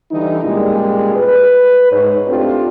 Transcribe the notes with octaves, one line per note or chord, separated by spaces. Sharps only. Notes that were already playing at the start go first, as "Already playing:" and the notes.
D3 E3 G3 D#4
F#2 A#2 G3 G#3 G#4
B4
G#2 C#5
A3 C4 D4 F4 G4 A4